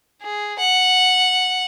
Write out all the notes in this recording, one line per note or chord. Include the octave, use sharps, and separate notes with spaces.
G#4
F#5